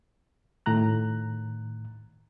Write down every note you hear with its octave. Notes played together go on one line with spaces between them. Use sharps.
A2 D#3 A#5 F#6